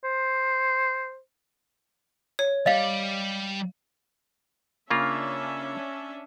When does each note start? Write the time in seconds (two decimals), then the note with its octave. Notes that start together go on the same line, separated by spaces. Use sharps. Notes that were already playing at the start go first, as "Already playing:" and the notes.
0.04 C5
2.39 C#5
2.66 G3 D#5 F5
4.90 C#3 A#3 C#4 D4 F4 E5